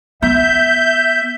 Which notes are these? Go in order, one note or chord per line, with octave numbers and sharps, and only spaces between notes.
B3 E5 G6